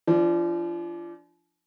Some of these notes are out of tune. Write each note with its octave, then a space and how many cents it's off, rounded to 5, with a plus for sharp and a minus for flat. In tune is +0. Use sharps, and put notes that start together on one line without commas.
F3 -30 D4 +0